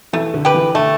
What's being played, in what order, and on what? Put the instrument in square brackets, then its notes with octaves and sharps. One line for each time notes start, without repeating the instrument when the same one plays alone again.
[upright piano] E3 [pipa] A3
[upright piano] D3
[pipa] G4 B4
[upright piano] E3
[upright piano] D3 [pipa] A3